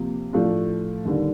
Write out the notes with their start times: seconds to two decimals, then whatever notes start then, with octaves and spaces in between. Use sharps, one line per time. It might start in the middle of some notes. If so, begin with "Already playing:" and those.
Already playing: C3 F3 A#3
0.33 A2 F3 A3 D4
1.05 D#2 D3 G3